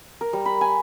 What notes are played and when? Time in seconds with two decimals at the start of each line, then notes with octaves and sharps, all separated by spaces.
0.21 A#4
0.33 G3
0.45 B5
0.61 G#5